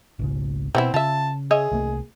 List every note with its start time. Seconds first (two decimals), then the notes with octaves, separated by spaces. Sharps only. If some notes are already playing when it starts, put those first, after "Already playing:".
0.19 G#1 C#2 C#3
0.75 B2 E3 B3 C4 E4
0.94 C#3 F4 E5 A5
1.51 G#4 C#5 D#5 E5
1.72 C2 A3 A#3